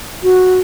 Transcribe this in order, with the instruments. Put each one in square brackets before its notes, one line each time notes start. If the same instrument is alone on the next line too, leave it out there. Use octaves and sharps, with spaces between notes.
[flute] F#4